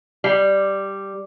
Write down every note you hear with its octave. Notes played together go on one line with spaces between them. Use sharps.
G3